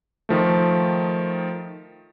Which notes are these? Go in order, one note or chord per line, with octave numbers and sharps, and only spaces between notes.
D#3 F3 A3